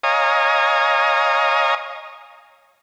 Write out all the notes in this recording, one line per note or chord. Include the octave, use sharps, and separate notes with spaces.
C#5 D#5 F5 G#5 A#5 D#6